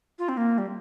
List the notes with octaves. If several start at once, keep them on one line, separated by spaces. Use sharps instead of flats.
F4
C4
A#3
G3